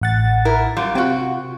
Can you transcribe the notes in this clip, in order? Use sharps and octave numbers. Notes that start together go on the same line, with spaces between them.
A1 F#5 A6
E4 A#4
F#2 G3 F4
C3 F4 F#4 G5